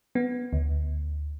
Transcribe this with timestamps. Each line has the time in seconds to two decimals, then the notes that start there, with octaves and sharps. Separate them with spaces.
0.15 B3
0.53 D2